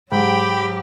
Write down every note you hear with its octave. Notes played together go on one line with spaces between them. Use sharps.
G#2 F#3 G4 G5 B5